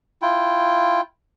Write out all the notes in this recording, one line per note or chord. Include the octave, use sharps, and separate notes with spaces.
E4 F4 G5